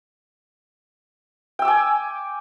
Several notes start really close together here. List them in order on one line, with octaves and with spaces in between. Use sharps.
G5 E6 D6 G#5